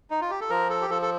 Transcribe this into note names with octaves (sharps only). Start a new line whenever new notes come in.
D#4
F4
G4
A4
F3 A#4
A4
G4
F3 A4
A4